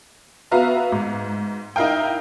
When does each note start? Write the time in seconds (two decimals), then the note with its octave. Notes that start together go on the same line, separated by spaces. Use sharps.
0.51 B3 F#4 B4 E5 F5 A#5
0.92 G#2
1.76 D#4 E4 A#4 F5 G5